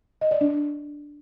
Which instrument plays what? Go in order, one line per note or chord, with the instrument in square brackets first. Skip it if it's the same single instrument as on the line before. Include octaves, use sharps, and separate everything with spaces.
[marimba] D#5
D5
D4